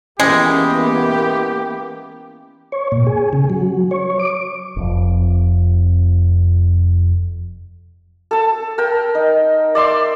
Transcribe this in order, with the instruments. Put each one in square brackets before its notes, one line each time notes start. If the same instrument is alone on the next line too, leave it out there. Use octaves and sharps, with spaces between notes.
[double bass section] E3 A#3 B3 [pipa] G#3 [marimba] C#4 [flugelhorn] G4
[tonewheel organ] C#5
A#2
G#4
C#3
F#3
C#5
D6
[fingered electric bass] F1 F2
[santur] A4 A5
A#4 G5
D#4
D5 E5 C6 D6